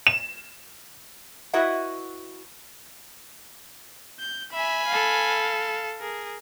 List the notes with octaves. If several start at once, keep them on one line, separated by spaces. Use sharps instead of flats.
E7
E4 F#4 B4 D#5 E5 F#5
G6
E5 G#5 B5
A4 F5
G#4 A#4